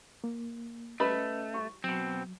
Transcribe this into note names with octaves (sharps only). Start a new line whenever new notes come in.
A#3
A3 C#4 B4 D#5 B5
C#6
B2 F#3 C4